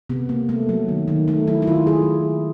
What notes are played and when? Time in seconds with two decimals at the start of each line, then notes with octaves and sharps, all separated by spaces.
0.10 C3 B3
0.29 A#3
0.49 A3
0.69 F#3
0.88 D#3
1.08 D#3
1.28 A3 D#4
1.47 F#3 E4
1.62 E4
1.67 D#3 F4
1.87 D#3 G#4